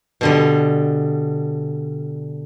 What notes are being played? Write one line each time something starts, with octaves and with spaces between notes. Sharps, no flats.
B2 D3 G3